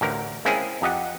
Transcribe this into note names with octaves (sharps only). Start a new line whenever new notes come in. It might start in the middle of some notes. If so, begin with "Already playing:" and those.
A1 D2 A#4
G#3 A#3 C4 C#4 E4 G#4
F2 G4 D#5 F#5